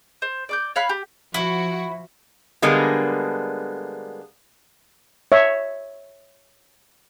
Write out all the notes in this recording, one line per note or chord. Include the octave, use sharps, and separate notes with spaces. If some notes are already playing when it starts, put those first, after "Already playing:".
C5
D5 D6 G6
C#5 F5 B5 F#6
G4
F3 E4 F#4
D3 G3 G#3 A#3 B3
C#5 E5